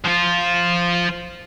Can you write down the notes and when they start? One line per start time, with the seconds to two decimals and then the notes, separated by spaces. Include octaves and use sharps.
0.04 F3 F4